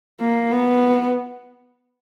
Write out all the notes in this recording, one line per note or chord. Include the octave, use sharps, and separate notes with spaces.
A#3
B3